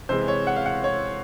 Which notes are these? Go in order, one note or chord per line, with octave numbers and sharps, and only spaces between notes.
C3 E3 G#3 C5
C#5
F#5
F5
F#5
C#5